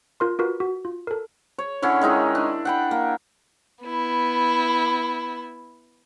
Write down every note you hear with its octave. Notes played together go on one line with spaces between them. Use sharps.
F4 A#4 C6
F4 F#4 A#4 B4
F#4
F4
A4 A#4
C#5
D3 C#4 E4 C#5
D#3 G#3 D#4 E4
D4
F#5 G5 B5
A#3
B3 E4